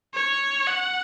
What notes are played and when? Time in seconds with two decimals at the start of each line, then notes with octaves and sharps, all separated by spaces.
0.14 C#5
0.67 F#5